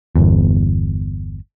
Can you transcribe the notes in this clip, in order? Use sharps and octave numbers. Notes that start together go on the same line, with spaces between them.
G1 E2